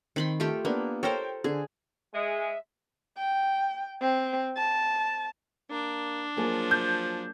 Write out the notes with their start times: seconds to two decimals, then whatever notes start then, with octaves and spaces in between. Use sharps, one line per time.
0.16 D#3 C4 B5 C6
0.40 A3 F4 G4
0.65 A#3 B3 D4
1.03 A4 A#4 C5 C#5 G5
1.44 D3 G#4
2.14 G#3 E5
3.18 G5
4.01 C4
4.57 A5
5.71 A#3 D4
6.37 F3 F#3 A#3 G#4
6.71 G6